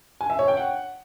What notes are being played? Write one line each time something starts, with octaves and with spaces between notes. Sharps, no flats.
G#5
E5
C#5
G5
F#5